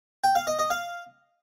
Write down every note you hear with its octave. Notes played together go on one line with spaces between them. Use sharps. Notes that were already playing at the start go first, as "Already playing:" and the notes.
G5
F5
D#5
D#5
F5